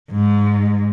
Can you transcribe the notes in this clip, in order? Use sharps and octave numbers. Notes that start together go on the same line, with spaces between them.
G#2